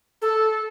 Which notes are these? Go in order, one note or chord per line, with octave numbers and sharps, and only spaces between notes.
A4